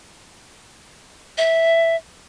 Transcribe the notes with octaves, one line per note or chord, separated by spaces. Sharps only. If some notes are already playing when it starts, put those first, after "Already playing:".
E5